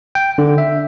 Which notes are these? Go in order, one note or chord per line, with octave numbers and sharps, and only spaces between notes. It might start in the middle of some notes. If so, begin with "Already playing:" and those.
G5
D3
E5